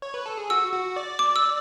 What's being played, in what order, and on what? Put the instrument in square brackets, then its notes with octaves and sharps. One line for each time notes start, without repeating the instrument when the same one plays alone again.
[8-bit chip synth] C#5
B4
A4
G#4
[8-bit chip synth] F#4 [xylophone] E6
[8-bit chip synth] F#4
D5
[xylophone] D6
E6